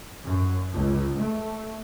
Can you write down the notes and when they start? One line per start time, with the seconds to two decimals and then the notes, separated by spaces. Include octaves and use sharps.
0.24 F#2
0.73 C#2
1.19 A3